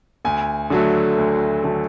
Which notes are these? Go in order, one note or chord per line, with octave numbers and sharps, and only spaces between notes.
D2 G#5
D3 F#3 A3
D2
D3 F#3 A3